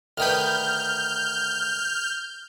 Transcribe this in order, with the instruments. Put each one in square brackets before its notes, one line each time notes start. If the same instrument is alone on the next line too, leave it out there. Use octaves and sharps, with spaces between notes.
[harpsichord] D2 D#3 B4 [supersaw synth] F6 G6